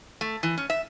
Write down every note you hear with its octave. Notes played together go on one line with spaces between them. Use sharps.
A3
E3
C#4
E5